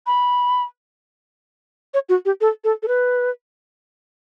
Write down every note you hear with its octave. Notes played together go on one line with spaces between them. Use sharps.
B5
C#5
F#4
G4
A4
A4
A4
B4